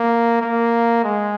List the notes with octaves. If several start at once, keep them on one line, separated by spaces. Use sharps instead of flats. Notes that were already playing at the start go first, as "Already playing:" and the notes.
Already playing: A#3
A#3
G#3